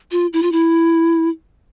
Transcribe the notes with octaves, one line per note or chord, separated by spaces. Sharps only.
F4
E4
F4
E4